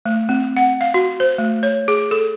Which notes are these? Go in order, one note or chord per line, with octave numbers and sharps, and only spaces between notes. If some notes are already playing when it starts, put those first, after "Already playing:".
A3
C4
F#5
F5
F#4
C5
A3
C#5
G#4
A4